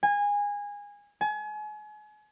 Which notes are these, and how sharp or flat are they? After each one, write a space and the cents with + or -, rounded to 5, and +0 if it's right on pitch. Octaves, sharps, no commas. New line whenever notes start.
G#5 -20
G#5 +35